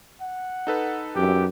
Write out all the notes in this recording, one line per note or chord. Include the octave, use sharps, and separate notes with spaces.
F#5
D#4 A4 B4
F#2 G4